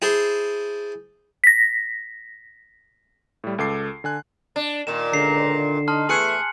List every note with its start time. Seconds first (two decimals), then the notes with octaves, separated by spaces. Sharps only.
0.02 E4 G#4 C5 A5
1.44 A#6 B6
3.44 A2 G3
3.58 C#2 A4 D6 C7
4.04 D3 G#5 F#6
4.56 D4
4.87 A#2 D#3 E7
5.13 C#2 D3 A#5 C7
5.88 D#4 A5 C6 F6
6.09 E2 A3 G#4 F#6 C#7 F#7